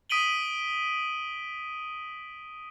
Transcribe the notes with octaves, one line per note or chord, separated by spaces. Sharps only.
D#6 B6 D7 D#7 F#7 G7